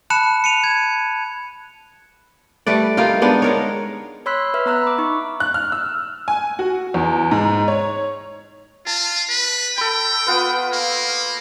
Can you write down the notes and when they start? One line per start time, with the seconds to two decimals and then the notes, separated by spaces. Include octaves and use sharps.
0.10 A5 B5 F#6 C#7 E7
0.44 C#7 D#7 F7
0.64 G#6
2.67 G3 A3 B4 D5
2.97 G3 A#3 D#4 F4
3.22 G#3 B3 D4 D#4
3.42 G#3 A#4 C#5
4.26 C#5 B5 C6 E6 F#6 B6
4.54 B4 E5 F6
4.66 B3 E5 A#5 E6 F#6
4.83 B5 D6
4.98 D#4 C#6
5.40 F#6
5.54 F6
5.72 E6
6.28 G#5
6.59 F#4
6.94 E2
7.31 G#2
7.68 C#5
8.87 F4 A5
9.29 B4
9.78 A4 G5 B5
10.26 B3 F4 B4
10.73 A#3